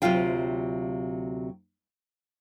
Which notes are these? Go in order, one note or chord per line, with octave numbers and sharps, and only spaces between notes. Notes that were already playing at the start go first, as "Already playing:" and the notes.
D2 C3 F#3 F4 F5 G5